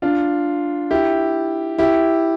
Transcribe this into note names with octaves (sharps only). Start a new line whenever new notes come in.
D4 F4
E4 G4
E4 G4